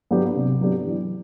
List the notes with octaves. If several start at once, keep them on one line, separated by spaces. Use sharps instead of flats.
F#3 B3 D4 G4
C3
F#3 B3 D4 G4
E3